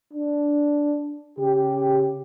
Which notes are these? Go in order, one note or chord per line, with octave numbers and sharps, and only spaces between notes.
D4
C#3 G4